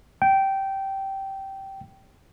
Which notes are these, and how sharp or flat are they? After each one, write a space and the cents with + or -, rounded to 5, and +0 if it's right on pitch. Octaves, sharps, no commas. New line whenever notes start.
G5 -15